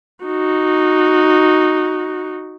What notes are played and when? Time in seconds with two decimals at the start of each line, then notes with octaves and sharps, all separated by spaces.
0.25 D#4 F#4